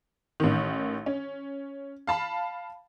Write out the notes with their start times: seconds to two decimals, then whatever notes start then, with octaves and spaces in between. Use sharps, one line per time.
0.40 A1 D#3
1.06 C#4
2.07 F5 A5 B5